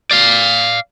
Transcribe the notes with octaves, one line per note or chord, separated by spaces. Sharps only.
D5 F5